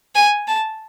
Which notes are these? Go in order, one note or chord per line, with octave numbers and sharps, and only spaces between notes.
G#5
A5